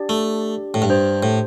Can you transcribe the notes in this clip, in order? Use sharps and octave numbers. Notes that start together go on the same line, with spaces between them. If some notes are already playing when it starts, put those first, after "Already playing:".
Already playing: D4 G4 D5
A3
A2
G2
D4 G4 C5
A2